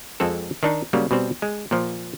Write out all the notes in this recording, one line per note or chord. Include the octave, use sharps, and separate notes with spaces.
F2 G#3 C4 A4
D#3 D4 D#4
C#3 F#3 G3 A#3
B2 G3 C4
G#3
A#2 F3